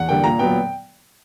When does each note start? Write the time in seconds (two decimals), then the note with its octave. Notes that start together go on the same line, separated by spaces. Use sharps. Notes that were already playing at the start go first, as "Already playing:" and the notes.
Already playing: E2 F#5
0.09 D3 G3 A#3 G5
0.24 A#2 A#5
0.39 F#3 B3 G5